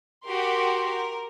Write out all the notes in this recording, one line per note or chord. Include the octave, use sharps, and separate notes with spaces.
F#4 G4 A#4 C6
A#4